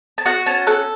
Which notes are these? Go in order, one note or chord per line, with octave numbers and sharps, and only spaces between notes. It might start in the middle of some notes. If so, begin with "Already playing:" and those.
A5
F#4 F#5
C#4 A5
A4 F#5